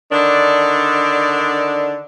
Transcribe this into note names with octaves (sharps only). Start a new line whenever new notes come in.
D3 D#3 D4